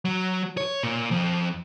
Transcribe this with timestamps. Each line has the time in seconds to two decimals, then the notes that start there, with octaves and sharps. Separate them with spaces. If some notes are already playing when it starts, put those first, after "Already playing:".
0.05 F#3
0.57 C#5
0.83 A#2
1.11 F2